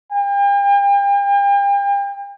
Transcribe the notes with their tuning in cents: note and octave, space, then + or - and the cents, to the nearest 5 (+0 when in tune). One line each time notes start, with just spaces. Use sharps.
G5 +40